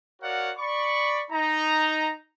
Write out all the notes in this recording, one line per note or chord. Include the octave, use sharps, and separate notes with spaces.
F#4 A#4 C#5 D5 F5 F#5
D5 B5 C#6
D#4 A#5